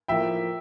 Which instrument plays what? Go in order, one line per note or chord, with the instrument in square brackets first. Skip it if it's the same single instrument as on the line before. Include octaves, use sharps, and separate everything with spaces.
[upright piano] A2 F3 A#3 [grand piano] E5 G5